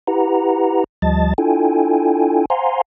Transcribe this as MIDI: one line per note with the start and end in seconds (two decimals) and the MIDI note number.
0.07 0.84 64
0.07 0.84 67
0.07 0.84 71
0.07 0.84 78
0.07 0.84 82
1.02 1.34 38
1.02 1.34 53
1.02 1.34 55
1.02 1.34 75
1.02 1.34 81
1.02 1.34 93
1.38 2.45 62
1.38 2.45 64
1.38 2.45 65
1.38 2.45 69
1.38 2.45 79
1.38 2.45 80
2.50 2.81 72
2.50 2.81 77
2.50 2.81 78
2.50 2.81 80
2.50 2.81 82
2.50 2.81 84